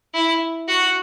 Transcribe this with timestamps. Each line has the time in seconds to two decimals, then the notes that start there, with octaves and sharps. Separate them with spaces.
0.14 E4
0.68 F#4